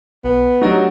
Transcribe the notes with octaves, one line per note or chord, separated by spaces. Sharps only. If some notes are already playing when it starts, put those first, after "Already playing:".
B1 B3
F#3 A3 D4 D#4 F#4 G4